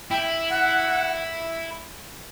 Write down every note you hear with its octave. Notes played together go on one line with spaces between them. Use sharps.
E4 G5
F#5